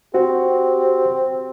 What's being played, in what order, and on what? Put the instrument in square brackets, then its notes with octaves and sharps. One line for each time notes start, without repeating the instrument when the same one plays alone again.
[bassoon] C4 [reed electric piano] F#4 [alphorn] G4